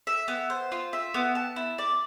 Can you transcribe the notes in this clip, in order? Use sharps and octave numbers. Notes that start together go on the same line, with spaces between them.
E5
B3
C5
F4
E5
B3
A5
E4
D5